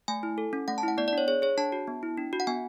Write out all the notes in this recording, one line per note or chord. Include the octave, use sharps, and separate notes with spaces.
A3 G#5
E4
A4
C#4
A3 F#5
A5
E4 F#5
B3 D5
D5
D4 C#5
G#4 C#5
G#4 C#5
D4 A5
F#4
B3
E4
D4
F#4
F#5
B3 G#5